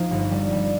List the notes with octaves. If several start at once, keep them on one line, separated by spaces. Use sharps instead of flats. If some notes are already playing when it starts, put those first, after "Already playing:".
Already playing: F3 C4 D#4 F4 C5
G1
G3
G3